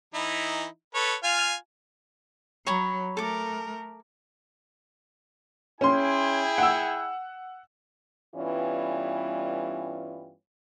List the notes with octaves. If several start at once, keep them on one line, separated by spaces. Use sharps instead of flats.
E3 D#4 E4
A4 B4 C#5
F4 F5 G#5
F#3 C#5 A#5 B5
A3 A4 A#4 D6
C#4 E4 G#4 G5 C6
F#5 E6
G2 E3 G3 B3 C#4 F4